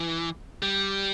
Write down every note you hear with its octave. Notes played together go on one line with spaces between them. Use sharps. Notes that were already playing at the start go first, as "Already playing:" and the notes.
Already playing: E3
G3